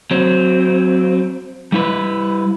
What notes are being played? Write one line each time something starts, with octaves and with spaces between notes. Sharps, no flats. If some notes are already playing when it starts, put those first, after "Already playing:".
F#3 C4
G3 E4 B4